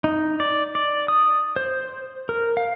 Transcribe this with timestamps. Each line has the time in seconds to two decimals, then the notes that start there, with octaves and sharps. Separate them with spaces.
0.04 D#4
0.40 D5
0.75 D5
1.08 D#6
1.56 C5
2.29 A#4
2.57 F5